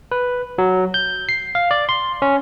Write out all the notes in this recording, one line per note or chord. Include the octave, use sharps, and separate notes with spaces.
B4
F#3
G6
C7
F5
D5
C6
C#4